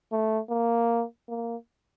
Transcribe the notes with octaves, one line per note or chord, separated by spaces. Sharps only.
A3
A#3
A#3